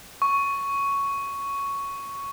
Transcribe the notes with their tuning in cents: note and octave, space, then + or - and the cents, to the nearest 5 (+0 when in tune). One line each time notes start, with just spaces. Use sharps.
C#6 +5